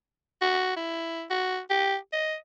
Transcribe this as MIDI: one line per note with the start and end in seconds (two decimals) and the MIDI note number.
0.41 0.74 66
0.76 1.25 64
1.30 1.59 66
1.70 1.96 67
2.12 2.35 75